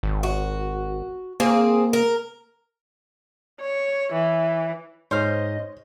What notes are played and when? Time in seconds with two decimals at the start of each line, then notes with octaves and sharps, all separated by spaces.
0.03 G#1
0.23 F#4
1.40 A#3 C4 G#4
1.93 A#4
3.60 C#5
4.13 E3
5.11 G#2 C5 C#5 D#5 F6